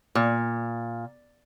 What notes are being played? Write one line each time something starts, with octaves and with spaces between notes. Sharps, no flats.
A#2